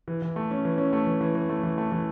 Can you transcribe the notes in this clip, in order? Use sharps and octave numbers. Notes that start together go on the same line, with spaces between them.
E3
E3
A3
C#4
E3
C#4
A3
E3
E3
E3
A3
E3
A3
E3